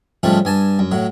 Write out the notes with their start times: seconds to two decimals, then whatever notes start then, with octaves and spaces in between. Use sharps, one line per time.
0.23 G#2 C#3 F3 G3 A3
0.45 G2 G#5 A5
0.79 F#2
0.92 A2 F#3